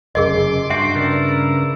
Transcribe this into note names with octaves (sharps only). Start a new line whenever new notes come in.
F1 F#2 C#3 G#4 A#4 D#5 C6 D6
G2 F#4 E5 G5 C6 D6
C#3 E4 A#4 B4 D5